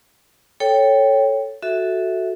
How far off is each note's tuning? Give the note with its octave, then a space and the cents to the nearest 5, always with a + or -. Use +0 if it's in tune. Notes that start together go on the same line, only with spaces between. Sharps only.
A4 +0 C#5 +0 G5 +0
F#4 +0 A4 -5 E5 -10